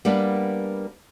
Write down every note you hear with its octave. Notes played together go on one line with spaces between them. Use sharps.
G3 A#3 B3 D4